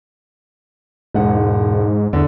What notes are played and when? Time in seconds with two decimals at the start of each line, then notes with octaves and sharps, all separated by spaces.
1.14 E1 G#2 F#5
2.13 E2 D3